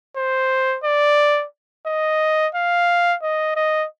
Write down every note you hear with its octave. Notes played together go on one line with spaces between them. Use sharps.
C5
D5
D#5
F5
D#5
D#5